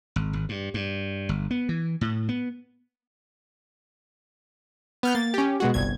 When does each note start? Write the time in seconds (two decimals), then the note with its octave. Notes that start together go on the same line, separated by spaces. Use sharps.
0.16 G#1
0.33 G#1
0.49 G2
0.74 G2
1.29 G1
1.51 B3
1.69 E3
2.01 A2
2.29 B3
5.03 B3 F6 G6
5.15 A#3 A6
5.34 C#4 G4
5.60 B2 G#3 F#4
5.74 G1 C2 G#6